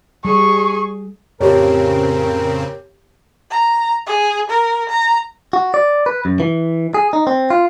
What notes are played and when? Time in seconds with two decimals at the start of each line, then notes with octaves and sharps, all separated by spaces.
0.25 G3 G#4 C#6
1.40 F2 A2 C#3 C4 G4 A#4 C#5
3.51 A#5
4.07 G#4
4.50 A#4
4.90 A#5
5.53 F#4
5.74 D5
6.06 B4
6.25 F#2
6.40 E3
6.94 G#4
7.13 D#4
7.27 C4
7.50 F4